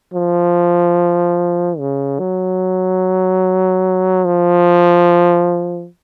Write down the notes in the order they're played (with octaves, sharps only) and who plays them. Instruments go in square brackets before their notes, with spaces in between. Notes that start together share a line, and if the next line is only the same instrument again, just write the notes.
[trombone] F3
C#3
F#3
F3